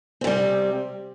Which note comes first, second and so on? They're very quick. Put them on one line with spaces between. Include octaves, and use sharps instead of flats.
C4 C3 G3